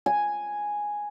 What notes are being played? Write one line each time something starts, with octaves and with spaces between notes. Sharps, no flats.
G#5